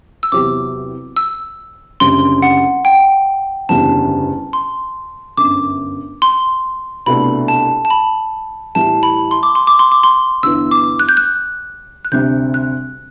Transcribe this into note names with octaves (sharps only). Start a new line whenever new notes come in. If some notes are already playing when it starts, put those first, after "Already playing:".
E6
E2 C3 F#3 C4 G4 D6
E6
F#1 F#2 D3 G3 C4 C6
F#5
G5
F#1 E2 D3 G3 A5
C6
G1 F#2 D3 D6
C6
C2 B2 A3 D4 B5
A5
A5
B5
A2 E3 G3 A5
B5
C6
D6
C6
D6
C6
D6
C6
G1 G2 E3 B3 E6
D6
F#6
G6
F#6
F#6
D2 C3 G3 G6
F#6